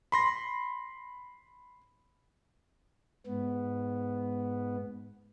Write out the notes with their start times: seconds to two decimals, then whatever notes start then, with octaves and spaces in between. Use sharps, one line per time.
0.12 B5 C6 A#6
3.27 G#2 B3